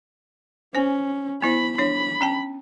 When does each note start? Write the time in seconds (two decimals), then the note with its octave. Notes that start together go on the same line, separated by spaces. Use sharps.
0.75 C#4 C5 G#5
1.42 B3 E4 C5 B5
1.78 D4 C#5 B5
2.21 C#4 G5 A5